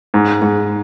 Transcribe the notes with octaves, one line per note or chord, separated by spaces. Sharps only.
G#2
G#2